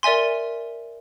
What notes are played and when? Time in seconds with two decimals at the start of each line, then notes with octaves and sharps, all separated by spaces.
0.03 A#4 D5 E5 G#5 C6